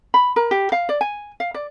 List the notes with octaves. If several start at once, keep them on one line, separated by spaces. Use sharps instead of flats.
B5
A#4
G4
F5
D5
G#5
F5
D5